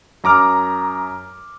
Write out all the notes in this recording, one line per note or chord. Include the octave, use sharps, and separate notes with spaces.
F#2 A#5 D6 F6